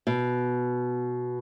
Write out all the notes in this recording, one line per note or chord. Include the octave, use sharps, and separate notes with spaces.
B2